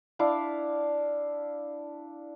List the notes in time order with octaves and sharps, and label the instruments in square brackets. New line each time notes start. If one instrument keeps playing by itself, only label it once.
[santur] D4 E4 F5